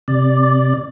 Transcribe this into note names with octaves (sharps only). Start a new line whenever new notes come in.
C3 D5